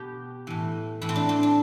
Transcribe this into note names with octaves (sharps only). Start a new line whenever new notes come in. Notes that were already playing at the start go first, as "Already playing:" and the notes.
Already playing: B2 G4
A2 E3
A2 E3 E4
C4
D4
C4
D4